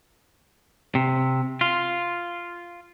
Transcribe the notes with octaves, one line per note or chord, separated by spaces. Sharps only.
C3
F4